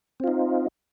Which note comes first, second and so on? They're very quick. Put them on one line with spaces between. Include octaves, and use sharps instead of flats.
C4 F4 D#4